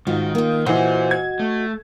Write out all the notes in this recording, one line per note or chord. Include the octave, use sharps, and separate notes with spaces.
G#2 D#3 F4 F#4
A#3 F4
A#2 E3 F#4 C5 D#5
G#6
A3